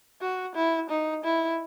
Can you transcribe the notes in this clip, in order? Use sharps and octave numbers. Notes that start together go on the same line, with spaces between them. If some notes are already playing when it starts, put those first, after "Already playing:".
F#4
E4
D#4
E4